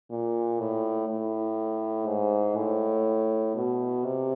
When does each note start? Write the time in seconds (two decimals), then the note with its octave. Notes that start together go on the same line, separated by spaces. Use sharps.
0.10 A#2
0.59 A2
1.09 A2
2.07 G#2
2.56 A2
3.55 B2
4.05 C3